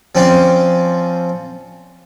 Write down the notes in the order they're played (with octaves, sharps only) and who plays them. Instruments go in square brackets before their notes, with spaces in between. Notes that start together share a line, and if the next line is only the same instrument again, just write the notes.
[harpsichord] F3 C4 C#4 D5